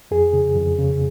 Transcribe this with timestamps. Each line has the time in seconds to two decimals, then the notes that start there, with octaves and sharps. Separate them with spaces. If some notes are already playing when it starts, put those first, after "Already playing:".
0.11 F2 G#4
0.33 C#3
0.55 F2
0.78 C#3